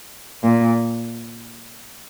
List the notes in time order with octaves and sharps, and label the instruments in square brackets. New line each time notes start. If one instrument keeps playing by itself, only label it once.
[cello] A#2